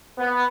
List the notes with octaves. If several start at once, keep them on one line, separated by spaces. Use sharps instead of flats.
B3